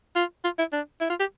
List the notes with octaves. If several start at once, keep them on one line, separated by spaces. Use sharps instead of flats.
F4
F4
E4
D4
E4
F4
G4